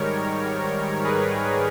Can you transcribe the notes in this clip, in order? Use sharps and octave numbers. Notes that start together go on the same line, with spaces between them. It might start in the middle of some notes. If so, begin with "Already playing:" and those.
Already playing: G#2 D#3 G3 A#4 C#5
G#4 B4